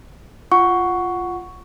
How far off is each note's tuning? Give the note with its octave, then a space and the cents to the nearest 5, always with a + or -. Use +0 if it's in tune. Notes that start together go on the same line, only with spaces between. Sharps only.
F4 +0 F#5 +0 C#6 +10